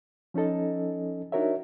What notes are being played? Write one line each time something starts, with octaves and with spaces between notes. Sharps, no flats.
F3 C#4 D#4 A4 D#5
D4 D#4 F#4 A#4 C#5 E5